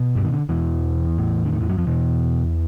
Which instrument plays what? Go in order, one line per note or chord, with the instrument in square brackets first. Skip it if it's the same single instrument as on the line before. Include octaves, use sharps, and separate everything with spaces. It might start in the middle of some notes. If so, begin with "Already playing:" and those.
Already playing: [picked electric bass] B2
G2 G3
D#3
D3
E2 B2 E3
A2
D3
D#3
E2 E3
F#2 F#3
F2 F3
E2 B2 E3